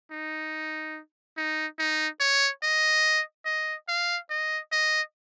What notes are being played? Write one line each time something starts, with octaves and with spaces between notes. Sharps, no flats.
D#4
D#4
D#4
C#5
D#5
D#5
F5
D#5
D#5